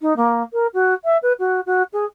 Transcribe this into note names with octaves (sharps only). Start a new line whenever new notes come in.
D#4
A#3
A#4
F#4
E5
B4
F#4
F#4
G#4